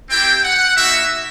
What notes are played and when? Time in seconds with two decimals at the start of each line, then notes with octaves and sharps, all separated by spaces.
0.08 C4 E4 G4 G5
0.43 F#5
0.76 A#3 D#4 F#4 E5